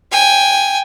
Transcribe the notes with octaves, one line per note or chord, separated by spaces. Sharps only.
G5 G#5